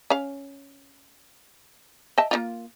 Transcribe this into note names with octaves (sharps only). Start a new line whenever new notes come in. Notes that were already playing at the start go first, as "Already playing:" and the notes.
C#4 F5
D#5 E5 A5
A#3 D4 F4